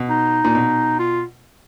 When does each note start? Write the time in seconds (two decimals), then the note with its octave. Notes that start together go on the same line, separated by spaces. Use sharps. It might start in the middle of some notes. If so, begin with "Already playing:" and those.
Already playing: B2
0.09 D#4
0.44 A#2
0.55 B2
0.99 F4